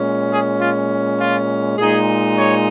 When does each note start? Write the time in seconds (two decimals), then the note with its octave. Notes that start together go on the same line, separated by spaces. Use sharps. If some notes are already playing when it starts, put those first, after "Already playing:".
Already playing: A#2 G#3 C#4
0.31 G#4
0.61 F4
1.20 F4
1.78 A#2 G#3 D#4 G#4
2.38 C#5